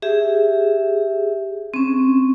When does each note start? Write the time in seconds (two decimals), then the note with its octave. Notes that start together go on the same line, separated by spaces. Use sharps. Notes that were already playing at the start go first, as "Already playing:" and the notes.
0.02 G4 G#4 E5
1.74 C4 C#4